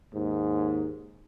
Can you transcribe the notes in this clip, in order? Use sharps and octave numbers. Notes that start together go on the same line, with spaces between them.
D#2 G#2